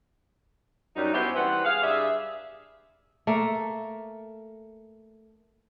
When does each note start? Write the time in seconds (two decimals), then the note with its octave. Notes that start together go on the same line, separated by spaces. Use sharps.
0.96 F#2 F#3 G3 D#4
1.12 B3 C#4 E4 F#4 G4 C5
1.34 E3 G3 C4 B4 F#5
1.64 G#4 F5
1.82 G2 G#4 D5 E5
3.27 A3 A#3